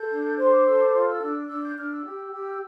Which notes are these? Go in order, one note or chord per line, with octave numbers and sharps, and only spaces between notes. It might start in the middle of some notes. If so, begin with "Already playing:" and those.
Already playing: A4 G6
D4
C5 C6
D6
A4 E6
D6
F4 C6
E6
D4 E6
D4 E6
G6
D4 F6
E6
G4
G4